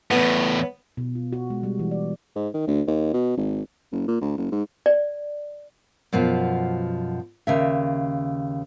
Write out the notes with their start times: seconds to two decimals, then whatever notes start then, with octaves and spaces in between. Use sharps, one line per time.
0.11 E2 A2 B3
0.97 B2
1.15 F4
1.33 F#4
1.50 G#3
1.63 G3
1.79 E3
1.91 D5
2.36 G#2
2.54 D#3
2.68 D2
2.87 D#2
3.14 B2
3.37 G#1
3.92 F#1
4.08 A#2
4.21 D2
4.37 F#1
4.52 G#2
4.86 D5
6.13 F#2 B2 F3
7.47 D#2 C#3 E5